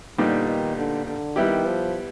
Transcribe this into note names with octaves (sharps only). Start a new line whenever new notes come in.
A#2 D3 G3 B3 D#4 G4
D#3
D3
D3
D#3 G3 B3 E4 G4
F3